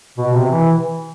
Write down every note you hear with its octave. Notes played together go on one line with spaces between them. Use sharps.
B2
C3
E3